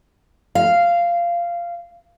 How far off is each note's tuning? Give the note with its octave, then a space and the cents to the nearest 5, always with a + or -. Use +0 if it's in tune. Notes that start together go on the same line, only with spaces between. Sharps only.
F5 -15